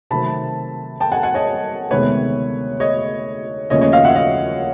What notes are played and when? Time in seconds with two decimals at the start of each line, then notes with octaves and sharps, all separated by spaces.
0.11 C3 D#3 F#3 A3 C4 A5 B5
1.00 G5 A5
1.12 F#5 G#5
1.23 F#5 G#5
1.34 C#5 D#5
1.91 D2 C3 D#3 G#3 B3 B4 C#5
2.80 C#5 D#5
3.70 D#2 C#3 F3 A3 C#4 C#5 D#5
3.81 C#5 D#5
3.92 D#5 F5
4.04 E5 F#5
4.15 D#5 F5